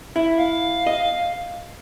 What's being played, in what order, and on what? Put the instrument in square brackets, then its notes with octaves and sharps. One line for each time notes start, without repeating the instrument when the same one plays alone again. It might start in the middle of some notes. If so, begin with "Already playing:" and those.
[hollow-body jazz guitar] E4
[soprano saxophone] F5
[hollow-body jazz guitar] D#5